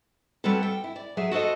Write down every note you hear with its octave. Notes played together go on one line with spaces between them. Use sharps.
G3 B3 C4 F#4 A4
G5
E4
D5
F#3 G#4 E5
F#4 A4 C5 D#5